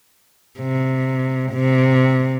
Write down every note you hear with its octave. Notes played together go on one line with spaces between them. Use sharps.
C3
C3